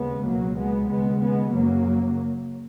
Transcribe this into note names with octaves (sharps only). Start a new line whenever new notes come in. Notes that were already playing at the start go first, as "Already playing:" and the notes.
Already playing: D#2 C#3 G#3 B3
C#2 B2 F#3 A#3
G#3 B3
D#2 C#3 G#3 B3
G#3 B3
F#2 C#3 F#3 A#3